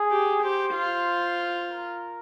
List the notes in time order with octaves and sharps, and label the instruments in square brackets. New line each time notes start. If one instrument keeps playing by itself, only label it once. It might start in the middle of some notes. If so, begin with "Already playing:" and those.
Already playing: [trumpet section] G#4
[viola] G4
[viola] G4 [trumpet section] C5
[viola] F4
[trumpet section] A#4